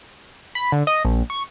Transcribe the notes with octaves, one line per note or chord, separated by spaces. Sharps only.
B5
D3
D#5
A#1
C#6